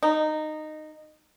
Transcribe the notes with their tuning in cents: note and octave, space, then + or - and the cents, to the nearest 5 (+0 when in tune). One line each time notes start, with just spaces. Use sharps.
D#4 -15